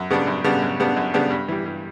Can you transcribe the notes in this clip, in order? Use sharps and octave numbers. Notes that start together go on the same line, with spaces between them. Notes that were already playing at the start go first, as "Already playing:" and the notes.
Already playing: F#2
C#3 G3 B3 D4
F#2
C#3 G3 B3 D4
F#2
C#3 G3 B3 D4
F#2
C#3 G3 B3 D4
G2
E3 G3
G2